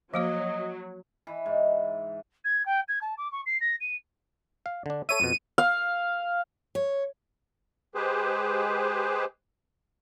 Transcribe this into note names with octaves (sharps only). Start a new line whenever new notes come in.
F3 F#3 A#3 F#4 D#5
E3
G#2
G#6
G5
G#6
A5
D6
C#6
C7
A#6
D#7
F5
D3 D4
A4 C#5 E5 D#7
F2 B2
F5
C#5
G#3 G4 G#4 B4 C5